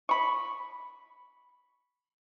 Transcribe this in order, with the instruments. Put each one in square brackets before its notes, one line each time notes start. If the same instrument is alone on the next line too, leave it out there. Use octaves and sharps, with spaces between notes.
[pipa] B5 C#6